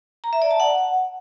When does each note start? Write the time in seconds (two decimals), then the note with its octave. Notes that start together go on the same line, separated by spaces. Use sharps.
0.24 A#5
0.33 E5
0.42 D5
0.51 A5
0.60 F#5